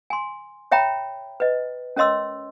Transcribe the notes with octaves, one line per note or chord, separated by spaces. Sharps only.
G#5 C6
C#5 E5 G5 A#5 B5
B4 D#5
C#4 A#4 C#5 D#5 C6 E6